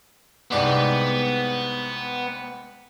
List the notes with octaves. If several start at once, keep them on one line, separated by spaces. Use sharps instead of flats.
C2 G#2 B3 D5